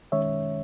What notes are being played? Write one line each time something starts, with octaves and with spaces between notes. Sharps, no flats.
D#3 G#3 C#4 C#5 E5